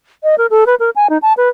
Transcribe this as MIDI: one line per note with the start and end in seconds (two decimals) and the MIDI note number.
0.24 0.35 75
0.38 0.46 70
0.50 0.64 69
0.66 0.75 71
0.80 0.90 70
0.96 1.07 80
1.10 1.18 63
1.22 1.33 81
1.37 1.49 71